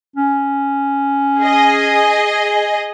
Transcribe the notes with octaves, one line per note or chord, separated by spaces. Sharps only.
C#4
G#4 D#5